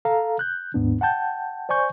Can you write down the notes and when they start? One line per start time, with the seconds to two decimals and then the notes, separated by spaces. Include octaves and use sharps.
0.05 A4 F5 A#5
0.39 F#6 G6
0.74 D#2 G#2 B3 D4
1.01 F#5 G5 A5 G6
1.69 C5 D5 G#5 C#6 G6